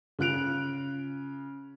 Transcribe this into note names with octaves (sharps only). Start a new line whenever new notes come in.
C#3 F4 F#6 D7 F7